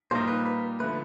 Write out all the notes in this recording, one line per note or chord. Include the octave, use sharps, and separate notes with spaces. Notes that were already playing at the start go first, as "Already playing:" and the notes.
A#2 G3 A#3 D#4 C5
B4
B4
D3 F3 A3 B4